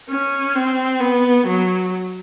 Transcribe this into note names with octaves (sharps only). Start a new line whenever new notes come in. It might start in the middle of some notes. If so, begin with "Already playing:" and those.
C#4
C4
B3
F#3